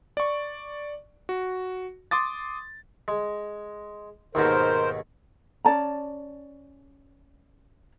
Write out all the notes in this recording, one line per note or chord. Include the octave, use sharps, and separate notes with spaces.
D5 C#6
F#4
C6 D6 D#6 A6
G#3
D#2 G#2 B2 A#4 C5
C#4 D5 A5 A#5